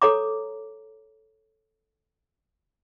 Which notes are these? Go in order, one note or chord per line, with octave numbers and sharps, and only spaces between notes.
A4 C#5 A#5 D6